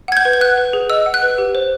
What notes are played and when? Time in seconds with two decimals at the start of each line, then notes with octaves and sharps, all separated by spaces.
0.08 F#5 G#6
0.17 G6
0.25 B4
0.33 G6
0.41 F#5 F#6
0.58 B4
0.73 G#4
0.90 D#5 E6
1.06 F#5
1.14 F#6
1.23 B4
1.38 G4
1.55 C5